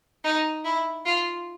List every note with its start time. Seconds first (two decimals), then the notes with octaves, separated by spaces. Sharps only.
0.24 D#4
0.65 E4
1.06 F4